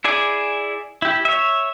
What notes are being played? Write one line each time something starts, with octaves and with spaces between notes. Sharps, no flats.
E4 G#4 D5 G#5
E4 G4
C#5 E5